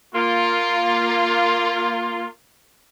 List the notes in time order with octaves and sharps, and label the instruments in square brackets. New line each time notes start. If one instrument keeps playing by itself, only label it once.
[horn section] A#3 F4